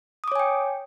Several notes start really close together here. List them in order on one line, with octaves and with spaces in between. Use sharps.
D#6 D6 C#5 G#5 G5